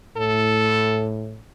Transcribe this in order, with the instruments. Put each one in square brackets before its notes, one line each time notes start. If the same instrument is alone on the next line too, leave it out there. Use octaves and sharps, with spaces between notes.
[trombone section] A2 [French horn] A4